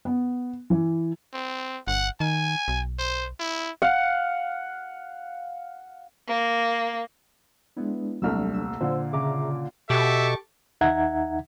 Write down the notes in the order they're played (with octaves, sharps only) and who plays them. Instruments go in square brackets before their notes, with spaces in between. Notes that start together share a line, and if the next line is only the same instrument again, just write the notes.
[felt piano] B3
E3
[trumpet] C4
[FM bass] G1 [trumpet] F#5
[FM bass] D#3 [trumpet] G#5
[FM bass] B1
[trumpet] C5
E4
[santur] F5 F#5
[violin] A#3
[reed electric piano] G#3 D4 [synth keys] B3 E4
[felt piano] D#1 C2 A3 [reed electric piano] F#3 D4 [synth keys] E6 F6
[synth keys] E6
[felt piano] A#2 D3 [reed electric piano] C5
[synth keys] C#3 C#4 D6 [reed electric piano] G#4 E5 A#5
[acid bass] B2 [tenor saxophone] G4 [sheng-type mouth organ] A4 C#6 D6 [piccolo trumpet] E5
[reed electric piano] D#2 D#4 E5 F#5 A#5 G#6